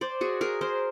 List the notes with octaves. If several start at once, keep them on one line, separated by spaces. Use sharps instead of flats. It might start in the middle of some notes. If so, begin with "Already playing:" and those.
C5 D5
F#4 G#4
G#4 A#4
A#4 C5